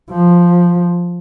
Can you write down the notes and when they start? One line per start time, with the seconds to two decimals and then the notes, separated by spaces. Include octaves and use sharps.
0.10 F3